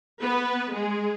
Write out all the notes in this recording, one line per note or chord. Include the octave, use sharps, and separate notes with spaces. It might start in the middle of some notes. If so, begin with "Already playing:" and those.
B3 B4
G#3 G#4